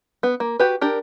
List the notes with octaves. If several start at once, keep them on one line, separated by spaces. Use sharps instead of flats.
B3
A#3
F#4 G4 B4
D4 G4 A#4